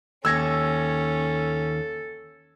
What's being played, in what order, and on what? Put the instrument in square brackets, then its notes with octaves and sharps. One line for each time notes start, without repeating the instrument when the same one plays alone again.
[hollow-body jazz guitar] D#2 [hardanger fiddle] C#4 [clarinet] A4 [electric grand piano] E6 G#6 A#6